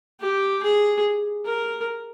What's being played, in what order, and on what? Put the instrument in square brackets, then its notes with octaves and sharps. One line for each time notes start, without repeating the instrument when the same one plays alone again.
[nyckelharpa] G4
G#4
A#4